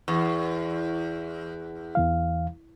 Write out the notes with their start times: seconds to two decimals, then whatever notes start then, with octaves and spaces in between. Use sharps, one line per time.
0.08 E2
1.95 E2 E3 F5